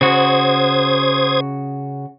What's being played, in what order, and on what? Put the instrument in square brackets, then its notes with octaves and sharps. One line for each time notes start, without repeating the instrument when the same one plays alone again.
[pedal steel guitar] C#3 F#4 [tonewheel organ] C5 D#6 G#6